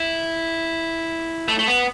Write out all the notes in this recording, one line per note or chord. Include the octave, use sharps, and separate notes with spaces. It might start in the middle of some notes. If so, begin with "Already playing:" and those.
Already playing: E4
A3
A3
B3